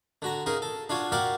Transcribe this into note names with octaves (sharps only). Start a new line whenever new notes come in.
D3 F#4 A#5
C#3 D#4 G#4 A#4
A4
D4 F4 F#4 C#5
F#4 G4 A#4 D5 F5 F#5